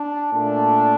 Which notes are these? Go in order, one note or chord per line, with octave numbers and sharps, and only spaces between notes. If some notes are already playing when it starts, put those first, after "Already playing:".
Already playing: D4
A#2 A3 D4